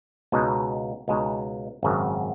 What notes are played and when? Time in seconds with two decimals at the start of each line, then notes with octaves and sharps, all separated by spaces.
0.32 C#2 B2 G#3 D#4
1.08 C#2 B2 G#3 D#4
1.83 G#1 F#2 C#3